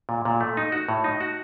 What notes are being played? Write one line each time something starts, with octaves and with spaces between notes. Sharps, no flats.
A#2
A#2
A3
D#4
F#4
A2
D#4
F#4